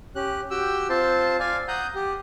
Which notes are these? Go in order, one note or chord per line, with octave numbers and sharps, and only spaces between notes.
C#4 G4 F#6
F#4 G4 G5 E6
C4 F4 C5 A5 C6
D5 F5 G#5
F#5 A#5 D#6 G6
G4